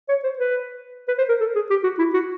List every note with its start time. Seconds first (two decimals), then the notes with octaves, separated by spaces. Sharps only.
0.09 C#5
0.24 C5
0.38 B4
1.08 B4
1.18 C5
1.29 A#4
1.40 A4
1.55 G#4
1.70 G4
1.83 F#4
1.99 E4
2.14 F#4